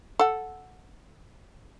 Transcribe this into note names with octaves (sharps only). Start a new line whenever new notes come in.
A4 F#5